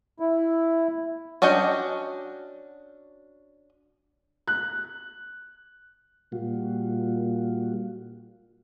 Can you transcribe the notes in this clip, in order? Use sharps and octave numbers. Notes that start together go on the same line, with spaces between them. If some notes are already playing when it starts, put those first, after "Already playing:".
E4
C#4 D4 F#4 D#5 G5
F#6
A#2 G3 F4 F#4